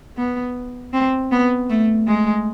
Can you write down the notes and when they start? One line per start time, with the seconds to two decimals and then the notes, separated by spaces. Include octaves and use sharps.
0.17 B3
0.93 C4
1.31 B3
1.70 A3
2.07 G#3